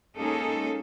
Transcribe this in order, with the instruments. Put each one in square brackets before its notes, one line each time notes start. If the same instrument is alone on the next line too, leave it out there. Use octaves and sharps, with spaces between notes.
[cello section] G#3 A#3 C#4 D#4 G#4 A4